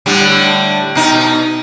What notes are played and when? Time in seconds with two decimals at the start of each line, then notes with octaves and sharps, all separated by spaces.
0.06 A2 D3 G3
0.95 B2 D#4